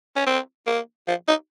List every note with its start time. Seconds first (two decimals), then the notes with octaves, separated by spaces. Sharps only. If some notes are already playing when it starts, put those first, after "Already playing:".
0.16 C#4
0.27 C4
0.67 A#3
1.08 F3
1.28 D#4